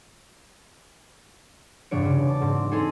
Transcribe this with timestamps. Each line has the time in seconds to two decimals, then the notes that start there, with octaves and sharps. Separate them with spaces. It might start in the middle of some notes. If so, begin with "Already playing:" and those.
1.91 E1 G2 C3 D4 C#5 D7
2.05 C#3
2.27 D5 A5 D6
2.41 G#2 C4
2.71 C4 D#4 G#4 A4